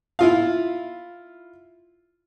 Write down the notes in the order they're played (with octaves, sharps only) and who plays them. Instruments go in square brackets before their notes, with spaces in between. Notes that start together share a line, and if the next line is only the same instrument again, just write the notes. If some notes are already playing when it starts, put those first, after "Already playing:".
[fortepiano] E4 F4 F5